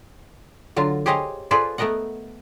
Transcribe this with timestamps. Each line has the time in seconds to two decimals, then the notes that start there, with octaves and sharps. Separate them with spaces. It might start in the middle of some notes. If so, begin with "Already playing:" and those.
0.76 D3 F#3 F4 A5
1.06 G4 G#4 C5 C#5 D#5 F5
1.51 F4 G#4 A4 B4 C5 D5
1.78 A3 B3 A#4 D#5 F#5